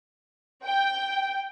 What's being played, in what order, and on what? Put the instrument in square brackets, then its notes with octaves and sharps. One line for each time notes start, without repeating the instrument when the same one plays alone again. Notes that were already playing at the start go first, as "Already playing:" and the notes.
[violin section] G5